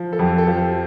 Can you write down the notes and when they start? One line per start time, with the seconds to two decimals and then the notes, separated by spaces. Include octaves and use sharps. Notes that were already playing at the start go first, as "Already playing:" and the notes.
Already playing: F3
0.13 A4
0.19 F2 G4
0.38 A4
0.47 F3 G4